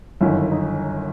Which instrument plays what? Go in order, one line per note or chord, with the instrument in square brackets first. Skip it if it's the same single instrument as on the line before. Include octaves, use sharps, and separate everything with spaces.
[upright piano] G1 F#2 D#3 E4
D#4